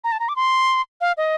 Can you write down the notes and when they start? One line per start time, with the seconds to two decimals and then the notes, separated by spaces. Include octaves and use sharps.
0.04 A#5
0.12 A5
0.20 A#5
0.29 D6
0.36 C6
1.01 F5
1.17 D#5